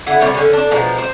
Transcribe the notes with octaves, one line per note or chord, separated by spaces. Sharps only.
D3 E4 F#5
C3 G3 C#5
D3 C#4
D4
B2 F3 G#3 A#5
C5